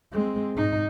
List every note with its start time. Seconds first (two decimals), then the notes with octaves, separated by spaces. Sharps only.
0.12 G#3 C4
0.54 G#2 D#4